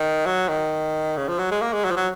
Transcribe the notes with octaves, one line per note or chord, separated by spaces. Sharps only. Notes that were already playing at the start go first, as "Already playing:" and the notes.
Already playing: D#3
F#3
D#3
C#3
F3
F#3
G#3
A#3
G#3
F#3
F3
F#3